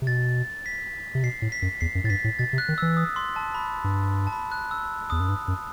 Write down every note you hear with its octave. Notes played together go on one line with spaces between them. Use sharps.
C3
B2 A6
B6
C3
B2 C7
A2
B6
F#2
E2 C7
F#2
A2 A6
G2 B6
A2
B2 A6
C3
F#6
D#3
E3 E6
D#6
C6
A5
B5
G2
A5
B5
F#6
E6
E2 D#6
F#2
G2
F#2